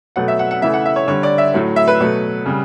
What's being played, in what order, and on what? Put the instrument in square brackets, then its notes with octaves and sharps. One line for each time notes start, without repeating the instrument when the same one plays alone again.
[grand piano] B2 F#3 A3 F#5
E5
F#5
F#5
C#3 E3 A3 E5
F#5
E5
C#5
D3 G3 C#5
D5
E5
A2 F#3 A3
E5
B4
B2 F#3 A3
C#3 G3